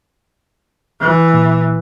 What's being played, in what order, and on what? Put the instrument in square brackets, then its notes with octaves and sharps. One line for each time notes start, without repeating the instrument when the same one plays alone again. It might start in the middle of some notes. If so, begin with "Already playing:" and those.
[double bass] E3
[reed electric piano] A#2